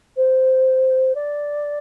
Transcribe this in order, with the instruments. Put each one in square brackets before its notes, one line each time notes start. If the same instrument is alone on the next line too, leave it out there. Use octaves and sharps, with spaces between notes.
[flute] C5
D5